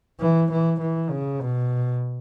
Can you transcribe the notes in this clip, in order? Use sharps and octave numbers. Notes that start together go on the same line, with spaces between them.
E3
E3
E3
C#3
B2